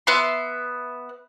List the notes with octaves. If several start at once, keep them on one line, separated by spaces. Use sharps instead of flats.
B3 E5 C6